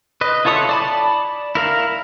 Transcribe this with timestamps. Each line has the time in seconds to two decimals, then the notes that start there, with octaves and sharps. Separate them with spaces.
0.21 B4 D#5
0.45 E4 F4 A4 C#5 D#6
0.69 D5 A5 B5
1.55 E4 A#4 F5